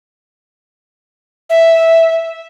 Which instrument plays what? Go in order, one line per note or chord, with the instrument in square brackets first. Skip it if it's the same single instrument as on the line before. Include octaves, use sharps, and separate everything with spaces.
[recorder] E5